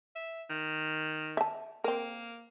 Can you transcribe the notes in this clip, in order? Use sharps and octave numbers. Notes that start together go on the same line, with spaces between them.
E5
D#3
E5 A5
A#3 C4 A#4